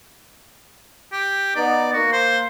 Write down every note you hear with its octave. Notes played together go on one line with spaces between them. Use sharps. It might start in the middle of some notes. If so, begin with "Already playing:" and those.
G4
B3 D#4 D5
A#3 F#4
C5